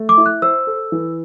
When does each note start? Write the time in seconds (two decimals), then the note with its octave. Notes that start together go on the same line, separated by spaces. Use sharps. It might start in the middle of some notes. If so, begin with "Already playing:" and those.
Already playing: A3
0.09 D6
0.18 E4
0.26 F#6
0.42 C5 E6
0.67 A4
0.92 E3